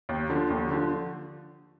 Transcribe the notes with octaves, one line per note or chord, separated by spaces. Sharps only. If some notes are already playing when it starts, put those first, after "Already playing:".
D#2
D3 F3
D#2
D3 F3